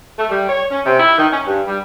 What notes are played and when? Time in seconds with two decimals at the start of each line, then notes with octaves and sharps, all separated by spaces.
0.18 A3
0.30 G3
0.48 C#5
0.71 C#4
0.85 C3
1.00 E4
1.18 D#3
1.32 C#4
1.46 G2
1.67 G3